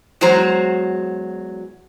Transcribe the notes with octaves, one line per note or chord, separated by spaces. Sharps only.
E2 F#3 G#3 F#4 C5 A#5